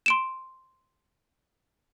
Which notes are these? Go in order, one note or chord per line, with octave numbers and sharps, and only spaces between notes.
C6 D7 E7